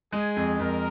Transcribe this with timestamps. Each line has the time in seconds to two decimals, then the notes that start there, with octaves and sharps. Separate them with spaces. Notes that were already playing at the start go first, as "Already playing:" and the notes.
0.12 G#3 G#4
0.36 F2
0.59 F2 A#4